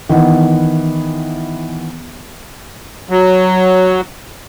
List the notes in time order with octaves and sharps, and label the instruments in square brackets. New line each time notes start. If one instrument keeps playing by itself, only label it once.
[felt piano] D#3 E3 B3
[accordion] F#3